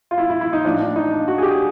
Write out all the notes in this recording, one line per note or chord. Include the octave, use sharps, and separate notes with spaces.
F4
E4
E4
E4
D#4
A2 F3 D4
D4
D#4
D4
F#4
G#4
G4
G#4